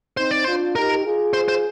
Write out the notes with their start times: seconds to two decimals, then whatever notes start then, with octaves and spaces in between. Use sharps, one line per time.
0.17 C4 D#4 C5
0.31 D5
0.44 D4 F4 C5
0.75 D#4 G4 A#4
1.04 F4 G#4
1.33 C5
1.48 C5